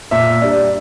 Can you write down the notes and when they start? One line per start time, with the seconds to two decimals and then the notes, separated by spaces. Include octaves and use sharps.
0.11 A#2 E5
0.42 G3 D4